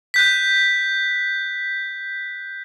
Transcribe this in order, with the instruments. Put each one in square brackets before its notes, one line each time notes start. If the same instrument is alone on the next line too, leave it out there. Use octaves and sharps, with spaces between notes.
[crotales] F#6 G6 B6